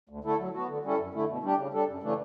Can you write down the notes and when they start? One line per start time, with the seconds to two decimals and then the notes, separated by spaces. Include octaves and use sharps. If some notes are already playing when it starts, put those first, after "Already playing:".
0.09 D2
0.24 D3 A3 E4 A4
0.39 F#3
0.54 B3 F#4
0.68 D3
0.84 G3 C#4 E4 A4
0.98 F#2
1.14 D3 A3 E4
1.28 B2
1.43 G3 D4 G4
1.58 C#3
1.73 G3 D4 A4
1.88 F#2
2.03 C#3 E3 A3 D4